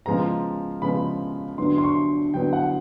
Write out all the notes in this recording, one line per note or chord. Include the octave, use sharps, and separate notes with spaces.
C#3 F3 G#3 B3 A#5
C#3 F3 G#3 B3 B5
D3 F#3 B3 C6
C6
C#6
D3 F#3 B3 G5
F#5